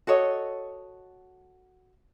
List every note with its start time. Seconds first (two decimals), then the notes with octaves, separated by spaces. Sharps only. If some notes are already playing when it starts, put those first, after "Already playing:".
0.07 F#4 A4 C#5 D#5